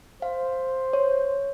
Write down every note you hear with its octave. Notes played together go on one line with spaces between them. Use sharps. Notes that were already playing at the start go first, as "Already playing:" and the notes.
C5 F5
C#5